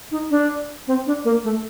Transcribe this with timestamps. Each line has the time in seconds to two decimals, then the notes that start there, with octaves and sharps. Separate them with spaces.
0.11 D#4
0.30 D4
0.87 C4
1.06 D4
1.24 A#3
1.44 A3